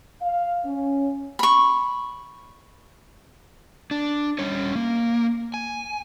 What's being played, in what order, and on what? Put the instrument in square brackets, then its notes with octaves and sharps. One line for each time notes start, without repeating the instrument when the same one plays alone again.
[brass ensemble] F5
C#4
[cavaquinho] B5 C#6
[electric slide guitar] D4
G3 C#4 C#5
A#3
G#5